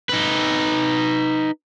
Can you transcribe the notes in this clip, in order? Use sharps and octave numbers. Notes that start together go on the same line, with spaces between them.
D#4 B4